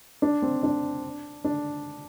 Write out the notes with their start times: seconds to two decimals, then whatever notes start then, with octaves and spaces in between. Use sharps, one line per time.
0.22 D4
0.42 C4
0.63 D4
1.44 D4